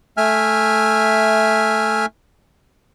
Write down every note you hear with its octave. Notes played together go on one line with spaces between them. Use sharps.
A3 E5 G#5 F6